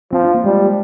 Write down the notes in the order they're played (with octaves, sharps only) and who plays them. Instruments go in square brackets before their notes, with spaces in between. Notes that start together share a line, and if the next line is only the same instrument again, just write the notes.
[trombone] F3 [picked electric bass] C4
[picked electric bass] D4
A#3
[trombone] G3 [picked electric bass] G#3